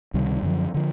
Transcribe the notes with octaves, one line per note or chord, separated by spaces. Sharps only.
C#2 C3 D#3 G3
F#2 D3 F3
D3 F3